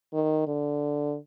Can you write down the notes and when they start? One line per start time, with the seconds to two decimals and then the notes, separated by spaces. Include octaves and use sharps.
0.13 D#3
0.47 D3